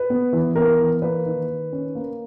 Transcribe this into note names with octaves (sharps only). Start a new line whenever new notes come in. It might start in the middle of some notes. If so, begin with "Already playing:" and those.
Already playing: B4
B3
E3
B3 A#4
E3
A#3 B4
D#3
D#3
C#4
A#3